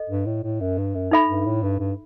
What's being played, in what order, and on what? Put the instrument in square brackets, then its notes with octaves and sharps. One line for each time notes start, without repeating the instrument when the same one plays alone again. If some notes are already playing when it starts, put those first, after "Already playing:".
Already playing: [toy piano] A4 D#5
[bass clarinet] G2
A2
A2
F#2
G2
F#2
[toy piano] D#4 A4 E5 B5
[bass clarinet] G2
A2
G2
G2